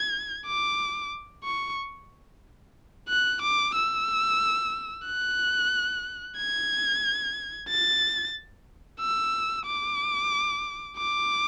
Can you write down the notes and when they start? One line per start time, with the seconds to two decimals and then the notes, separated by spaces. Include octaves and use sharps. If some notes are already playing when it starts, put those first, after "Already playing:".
Already playing: G#6
0.46 D6
1.44 C#6
3.09 F#6
3.42 D6
3.75 E6
5.06 F#6
6.37 G#6
7.69 A6
9.00 E6
9.66 D6
10.97 D6